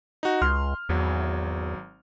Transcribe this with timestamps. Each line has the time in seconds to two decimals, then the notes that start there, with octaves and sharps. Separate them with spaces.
0.23 D#4 F#4
0.42 C#2 C6 F6
0.89 G#1 E2 F#3